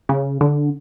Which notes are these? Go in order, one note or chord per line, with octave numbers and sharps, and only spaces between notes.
C#3
D3